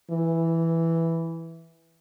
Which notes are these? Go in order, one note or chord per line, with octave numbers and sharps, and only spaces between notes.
E3